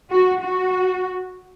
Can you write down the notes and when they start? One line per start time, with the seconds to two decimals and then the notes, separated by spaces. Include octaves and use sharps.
0.10 F#4
0.40 F#4